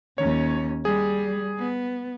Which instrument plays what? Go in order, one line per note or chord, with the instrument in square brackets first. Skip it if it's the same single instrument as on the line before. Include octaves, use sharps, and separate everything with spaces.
[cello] D#2 C#4 [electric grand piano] C#5
[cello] G3 [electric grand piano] G#4
[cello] B3